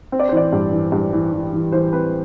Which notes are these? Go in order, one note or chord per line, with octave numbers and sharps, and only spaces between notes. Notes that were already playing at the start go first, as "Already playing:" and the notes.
C4
D5
C5
E3 D5
G2
E3
G2
E3
E3
E3
E3 C5
C4 B4